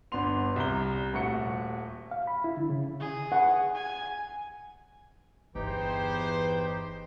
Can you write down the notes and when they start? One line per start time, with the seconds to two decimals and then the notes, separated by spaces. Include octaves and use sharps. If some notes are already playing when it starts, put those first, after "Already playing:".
0.12 G1 B3 D4 C6 F7
0.56 C2 A#5 G7
1.13 D#1 A3 F#4 C#6 C#7
2.11 F5
2.27 B5
2.44 E4
2.57 D3
2.69 C#3
3.00 G#4
3.32 F#5
3.74 G#5
5.55 G1 E2 E3 D#4 G4 B4 C5 G5